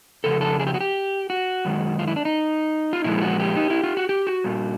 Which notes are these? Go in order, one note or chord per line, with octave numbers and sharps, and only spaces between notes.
F2 C#3 A4
A4
G#4
G4
F#4
G4
F#4
F#2 D#3 G#3
F4
E4
D4
D#4
F4
A#2 F3 G#3 E4
G4
F#4
G4
D#4
E4
F4
F#4
G4
F#4
A#2 G3